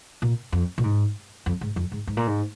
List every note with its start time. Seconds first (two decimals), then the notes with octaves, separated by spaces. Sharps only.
0.22 A#2
0.52 F2
0.78 A#2
0.83 G#2
1.46 F2
1.61 G#2
1.76 F2
1.92 G#2
2.07 G#2
2.17 A#2
2.27 G#2